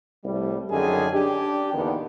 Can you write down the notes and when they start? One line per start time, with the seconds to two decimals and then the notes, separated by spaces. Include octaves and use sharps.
0.25 C2 A2 G3
0.70 F#2 D3 D#3 G#4 G#5
1.12 D4 G4
1.74 E2 A#2 D3 D#3 B3